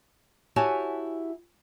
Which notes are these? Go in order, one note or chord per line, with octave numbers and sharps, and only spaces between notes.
E4 F#4 G4 C#5 G#5 A5